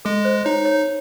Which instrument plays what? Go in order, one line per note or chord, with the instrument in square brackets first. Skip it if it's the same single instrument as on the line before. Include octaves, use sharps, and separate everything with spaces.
[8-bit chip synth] G#3 [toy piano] A4
[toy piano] C5
[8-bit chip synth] D#4 [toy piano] C#5
[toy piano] C#5